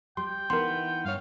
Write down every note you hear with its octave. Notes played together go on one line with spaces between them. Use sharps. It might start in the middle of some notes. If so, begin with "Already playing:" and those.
G3 G5 C6
E3 B3 D#4 A#4 C6
G2 C#5 F5